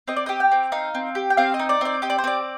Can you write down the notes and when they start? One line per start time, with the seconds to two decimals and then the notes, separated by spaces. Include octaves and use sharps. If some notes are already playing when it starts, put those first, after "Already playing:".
0.08 C4 D#5
0.16 D5
0.26 G4 D#5
0.40 G5
0.52 C4
0.72 D#4 F5
0.94 C4
1.15 G4
1.30 G5
1.37 C4 F5
1.54 D#5
1.59 D#4
1.69 D5
1.81 C4 D5
2.02 G4 D#5
2.10 D5
2.18 C5
2.24 C4 D5